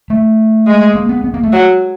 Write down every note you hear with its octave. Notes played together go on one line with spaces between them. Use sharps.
A3
G#3
A#3
B3
B3
A#3
A3
F#3